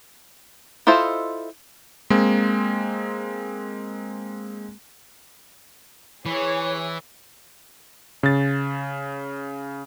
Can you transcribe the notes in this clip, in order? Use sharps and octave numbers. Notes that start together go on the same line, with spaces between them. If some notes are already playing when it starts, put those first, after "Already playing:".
E4 F4 A4 C5 D#5
G#3 A#3 C4
E3 G#4 C#5
C#3 A6